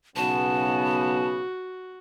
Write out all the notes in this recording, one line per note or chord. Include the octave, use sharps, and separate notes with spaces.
B1 C#3 B3 F#4 A5